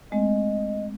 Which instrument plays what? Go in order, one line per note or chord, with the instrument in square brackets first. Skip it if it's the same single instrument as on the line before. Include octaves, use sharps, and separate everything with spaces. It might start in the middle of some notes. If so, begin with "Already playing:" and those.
[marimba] G#3 A3 C4 [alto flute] D#5